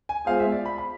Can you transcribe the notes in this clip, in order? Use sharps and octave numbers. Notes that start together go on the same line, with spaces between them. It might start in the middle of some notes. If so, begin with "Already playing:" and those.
G#5
G#3 B3 F4 G#4 C5 F5
E5
D5
B5
B5